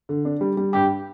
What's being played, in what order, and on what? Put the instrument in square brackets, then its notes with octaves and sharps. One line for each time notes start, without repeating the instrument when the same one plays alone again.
[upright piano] D3
D4
G3
G3
[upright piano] G2 [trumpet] G4